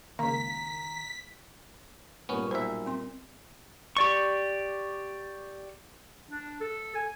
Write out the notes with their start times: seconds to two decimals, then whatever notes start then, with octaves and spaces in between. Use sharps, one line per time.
0.19 C#2 D#3 A#3 A#5 B6
2.29 A#2 G3 A#3 B3 C#4
2.51 B1 C5 E5
2.86 C4 C6
3.97 G4 D5 C#6
6.31 D4
6.61 A4
6.95 G#5